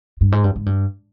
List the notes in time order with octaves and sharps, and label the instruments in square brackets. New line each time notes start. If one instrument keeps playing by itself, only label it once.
[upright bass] G2
G#2
G2
G#2
G2